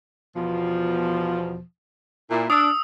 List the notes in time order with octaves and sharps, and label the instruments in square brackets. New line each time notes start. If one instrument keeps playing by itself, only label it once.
[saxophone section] E2 B2 F3
A#2 E4
[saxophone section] D4 [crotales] D#6 E6